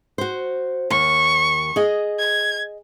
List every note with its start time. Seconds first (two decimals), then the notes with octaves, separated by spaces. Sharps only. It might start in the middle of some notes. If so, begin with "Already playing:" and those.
0.18 F#4 C5
0.90 D#2 C#6
1.76 G#4 D#5
2.19 G#6